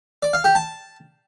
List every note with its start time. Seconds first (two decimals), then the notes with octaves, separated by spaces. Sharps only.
0.23 D5
0.33 F5
0.44 G4
0.55 A5